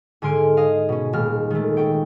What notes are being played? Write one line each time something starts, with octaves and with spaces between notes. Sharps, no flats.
G#2 D3 G#5 C6 F6 D7
G#4 D#5 F5
B2 C#4
D#1 G#3 A#3 F6
D#3 G#3 A3
A3 C#4 G5